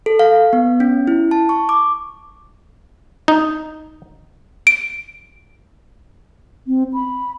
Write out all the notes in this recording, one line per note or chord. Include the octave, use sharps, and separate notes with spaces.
A4
F5
B3
C#4
E4
A5
C#6
D6
D#4
D7
C4
B5